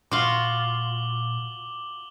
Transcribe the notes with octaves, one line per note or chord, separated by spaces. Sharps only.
A#2 F4 F#4 D6 F#7 G7